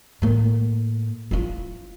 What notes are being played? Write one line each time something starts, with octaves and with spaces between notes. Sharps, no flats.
A2 A#3
E4 F4